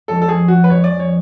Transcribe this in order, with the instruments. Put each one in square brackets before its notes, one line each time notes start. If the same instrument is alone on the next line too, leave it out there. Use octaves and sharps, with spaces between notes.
[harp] F2 F3 G#3 C#4 [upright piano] A4
[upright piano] A4
G#4
F#4
B4
[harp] F2 F3 G#3 C#4 [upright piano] C#5
[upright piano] D5
C#5